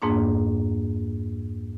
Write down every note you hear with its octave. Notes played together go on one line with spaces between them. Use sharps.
F2 G#2 A#3 D4